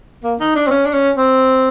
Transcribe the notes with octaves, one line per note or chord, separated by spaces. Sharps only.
A#3
D#4
D4
C4
C#4
D4
C#4
C4